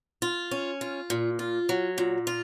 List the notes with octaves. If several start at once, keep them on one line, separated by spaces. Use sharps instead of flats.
F4
C#4
F4
A#2
F4
F#3
A#2
F4